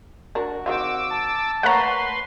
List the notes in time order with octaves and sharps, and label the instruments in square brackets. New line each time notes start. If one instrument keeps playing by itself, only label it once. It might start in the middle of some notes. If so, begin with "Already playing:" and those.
[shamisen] D4 A#4 [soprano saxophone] F#4
[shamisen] D#3 C4 F4 [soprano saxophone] F#4 [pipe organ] D6 E6
[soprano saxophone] A5
[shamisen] A3 A#3 C#5 [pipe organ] B4 C6 [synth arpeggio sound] F#5 A#5